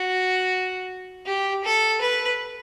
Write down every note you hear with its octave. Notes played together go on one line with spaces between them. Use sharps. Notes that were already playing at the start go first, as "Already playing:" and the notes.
Already playing: F#4
G4
A4
B4